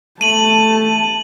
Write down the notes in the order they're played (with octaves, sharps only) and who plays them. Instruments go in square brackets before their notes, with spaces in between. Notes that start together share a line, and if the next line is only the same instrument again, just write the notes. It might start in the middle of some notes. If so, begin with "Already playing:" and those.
[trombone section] A3 [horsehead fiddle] A5 [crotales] D#7 F#7